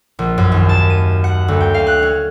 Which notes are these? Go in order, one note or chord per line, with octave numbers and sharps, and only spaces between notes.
A#1
F#2
D#2
A5
D#7
F#5
D2
G5
F5
F#6
C#4